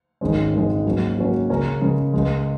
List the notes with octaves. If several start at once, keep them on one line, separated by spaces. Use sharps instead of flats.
G#1 G#2 D#3 G#3 C#4
G#1 G#2 D#3 G#3 C#4
G#2 F#3 A#3 C#4 F#4
G#2 F#3 A#3 C#4 F#4
C#3 G#3 C#4 A#4
C#3 G#3 C#4 A#4
C#2 C#3 G#3